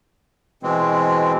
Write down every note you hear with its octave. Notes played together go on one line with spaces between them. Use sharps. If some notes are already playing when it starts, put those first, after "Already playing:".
B2 E3 G#3 C4